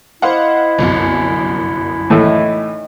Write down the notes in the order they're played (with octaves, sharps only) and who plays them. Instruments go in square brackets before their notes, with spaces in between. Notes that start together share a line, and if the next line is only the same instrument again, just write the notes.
[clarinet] E4 [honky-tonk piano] C5 F5 F#5 [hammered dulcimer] D#5 D6
[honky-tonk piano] G1 C2 F#2 [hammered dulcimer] C#3 D4
[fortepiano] A2 E3 A3 [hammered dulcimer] D#3